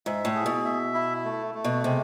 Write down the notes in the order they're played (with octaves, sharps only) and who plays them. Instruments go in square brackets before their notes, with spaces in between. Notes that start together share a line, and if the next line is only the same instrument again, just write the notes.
[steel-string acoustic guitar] G#2 [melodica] E5
[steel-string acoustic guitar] A2
[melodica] G#4
[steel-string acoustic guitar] B2
[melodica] E5
E4
A3
A3
[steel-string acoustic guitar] B2
[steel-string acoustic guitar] C3 [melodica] G#3